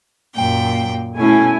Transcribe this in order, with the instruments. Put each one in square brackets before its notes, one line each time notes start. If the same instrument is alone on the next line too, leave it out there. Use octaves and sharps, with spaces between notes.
[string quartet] F#2 A#2 G5
[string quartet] B2 C#4 [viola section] A3 E4 G#5